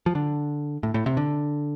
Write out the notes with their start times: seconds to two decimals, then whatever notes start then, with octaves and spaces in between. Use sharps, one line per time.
0.06 F3
0.15 D3
0.83 A2
0.94 A2
1.06 C3
1.17 D3